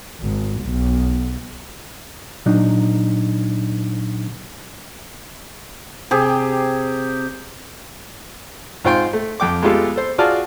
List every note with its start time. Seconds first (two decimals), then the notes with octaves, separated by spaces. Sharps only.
0.21 G#1
0.62 B1
2.46 A#2 F#3 D4 D#4
6.11 C3 G4 G#4
8.84 G#2 F4 C5 G5 C6
9.13 A3
9.40 F2 G5 D6
9.62 G#3 A3 B3 F4 G4 A4
9.96 A4 C5
10.18 F4 F#4 G#4 D5 A5 F6